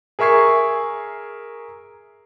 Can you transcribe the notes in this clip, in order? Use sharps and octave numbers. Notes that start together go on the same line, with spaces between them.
G#4 A#4 E5 C#6 G#6 C7